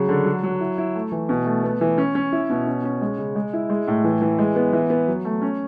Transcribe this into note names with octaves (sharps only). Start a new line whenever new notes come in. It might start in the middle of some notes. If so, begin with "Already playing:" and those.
Already playing: C#3 F#3
D3
F#3
F#3
E4
E4
A3
E3
B2
A3
B3
E3
C#4
C#4
E4
B2
C#4
C#4
G#3
C#3
G#3
E4
G#3
A2
E3
E3
G#3
B3
E3
B3
F#3
A3
C#4